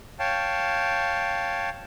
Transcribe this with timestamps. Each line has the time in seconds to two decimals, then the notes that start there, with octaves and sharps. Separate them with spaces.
0.19 C#5 F5 G5 A5